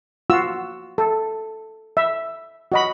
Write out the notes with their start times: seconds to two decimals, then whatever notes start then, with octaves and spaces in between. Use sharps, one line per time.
0.30 F4 F#4 E6
0.98 A4
1.97 E5
2.72 F#4 D#5 B5